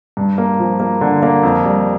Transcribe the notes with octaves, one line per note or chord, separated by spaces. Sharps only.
G2
A#3
F3
A#3
D3
A#3
F2
G3